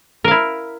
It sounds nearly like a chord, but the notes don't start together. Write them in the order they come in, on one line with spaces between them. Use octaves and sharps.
A#4 F5 E4